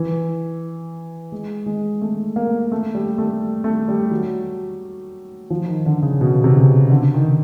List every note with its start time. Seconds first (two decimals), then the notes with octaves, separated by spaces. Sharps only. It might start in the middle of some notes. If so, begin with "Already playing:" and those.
Already playing: E3
1.32 G#3
1.66 G#3
2.02 A3
2.36 A#3
2.72 A3
2.95 G3
3.18 A3
3.64 A3
3.88 G3
4.11 F#3
5.50 F3
5.68 D#3
5.86 D3
6.02 C#3
6.21 B2
6.44 C3
6.56 C#3
6.90 D3
7.14 D#3